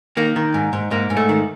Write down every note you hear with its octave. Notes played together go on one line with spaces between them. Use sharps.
D#3 A#3
D#3
G#2
G#2
G#2 A#3
G#2
A3
D#3